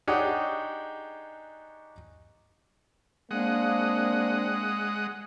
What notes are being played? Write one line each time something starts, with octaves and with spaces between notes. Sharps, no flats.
D4 D#4 G4 G#4 C#5 F#5
G#3 A#3 C4 D4 F#5 D#6